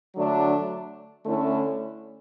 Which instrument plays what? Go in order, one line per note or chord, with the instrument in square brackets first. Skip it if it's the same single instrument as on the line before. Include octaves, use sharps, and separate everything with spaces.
[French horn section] D3 F#3 A3 D4
D3 A3 C#4 E4 A4